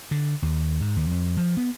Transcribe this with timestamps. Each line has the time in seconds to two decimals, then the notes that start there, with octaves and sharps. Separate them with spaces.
0.11 D3
0.42 D#2
0.81 G#2
0.96 D#2
1.11 F2
1.37 F3
1.57 B3